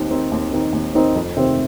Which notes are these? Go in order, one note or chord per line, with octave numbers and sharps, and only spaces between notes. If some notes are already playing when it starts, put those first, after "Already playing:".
Already playing: D#2 D#3 C4 D#4
D#3 C4 D#4
D#2
D#3 C4 D#4
D#2
D#3 C4 D#4
F2
C3 D#3 C4